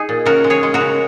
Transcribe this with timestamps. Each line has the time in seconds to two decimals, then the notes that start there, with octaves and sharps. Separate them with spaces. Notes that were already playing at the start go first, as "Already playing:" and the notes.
Already playing: D#4 G#4
0.09 A#2
0.26 C#3 F#4 A#4
0.44 G#3
0.50 G#4 C#5
0.63 G#3
0.74 F#4 A#4
0.81 C#3